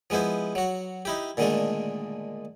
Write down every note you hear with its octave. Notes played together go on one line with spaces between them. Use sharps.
F3 G#3 B3 E4 C5
F#3 F#4
D#4 E4 G4
A#2 D3 D#3 G#3 A3 D4